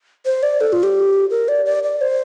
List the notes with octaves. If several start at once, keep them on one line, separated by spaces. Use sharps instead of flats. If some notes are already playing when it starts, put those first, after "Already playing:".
C5
D5
A4
F4
G4
A#4
D5
D5
D5
C5